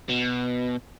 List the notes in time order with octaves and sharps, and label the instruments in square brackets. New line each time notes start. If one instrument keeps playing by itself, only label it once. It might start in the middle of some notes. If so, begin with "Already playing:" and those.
[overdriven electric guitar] B2